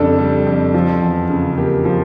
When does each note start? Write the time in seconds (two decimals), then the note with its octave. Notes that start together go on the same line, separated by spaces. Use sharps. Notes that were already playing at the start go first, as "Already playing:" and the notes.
Already playing: F2 C#3 G3 D4 A4
0.19 G3
0.46 F2
0.74 F3
1.02 E2
1.30 C#3
1.57 A#3 G4
1.85 F3